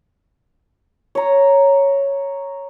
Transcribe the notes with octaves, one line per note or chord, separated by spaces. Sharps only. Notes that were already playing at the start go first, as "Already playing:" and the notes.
C#5 A#5